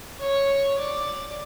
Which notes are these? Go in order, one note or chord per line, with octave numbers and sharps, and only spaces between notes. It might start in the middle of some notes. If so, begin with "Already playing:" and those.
C#5
D5